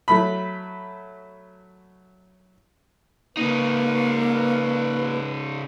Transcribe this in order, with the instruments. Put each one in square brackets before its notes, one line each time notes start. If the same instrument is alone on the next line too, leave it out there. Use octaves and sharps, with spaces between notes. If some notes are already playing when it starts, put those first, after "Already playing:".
[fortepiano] F#3 A3 B5
[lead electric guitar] C#3 D#4 [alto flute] A#3 [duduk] B4
[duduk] B4